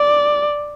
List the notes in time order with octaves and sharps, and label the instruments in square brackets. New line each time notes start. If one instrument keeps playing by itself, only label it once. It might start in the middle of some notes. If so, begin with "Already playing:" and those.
Already playing: [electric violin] D5